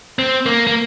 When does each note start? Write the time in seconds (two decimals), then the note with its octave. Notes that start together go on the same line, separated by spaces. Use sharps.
0.19 C4
0.46 A#3
0.67 A#3